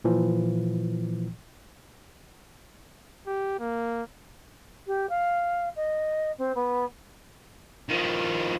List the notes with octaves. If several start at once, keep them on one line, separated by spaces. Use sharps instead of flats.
A#2 E3 F3
G4
A#3
G4
F5
D#5
C4
B3
D#3 F3